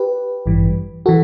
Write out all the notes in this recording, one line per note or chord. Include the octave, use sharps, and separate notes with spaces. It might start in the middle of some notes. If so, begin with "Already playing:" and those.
Already playing: G4 B4
A1 G2 E3 G3
E3 F#4 A4